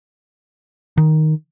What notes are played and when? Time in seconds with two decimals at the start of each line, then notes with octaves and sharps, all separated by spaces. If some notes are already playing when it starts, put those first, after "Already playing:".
0.97 D#3